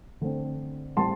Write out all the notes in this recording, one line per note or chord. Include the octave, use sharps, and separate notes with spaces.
D3 A3 C4
A2 G3 C4 A5 C6